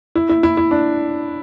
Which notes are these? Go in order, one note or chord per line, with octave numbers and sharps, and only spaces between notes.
E4
E4
E4
E4
D4